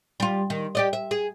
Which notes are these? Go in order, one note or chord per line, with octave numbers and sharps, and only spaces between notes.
G3 F4
D#3
G4 D5 D#5
E5
G#4